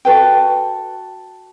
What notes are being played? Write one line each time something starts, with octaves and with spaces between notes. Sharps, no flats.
F#4 A4 B4 G5